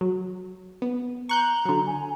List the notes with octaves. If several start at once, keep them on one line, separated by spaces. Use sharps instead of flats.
F#3
B3
A#5 C#6 F#6 G6
D3 F#3
G#5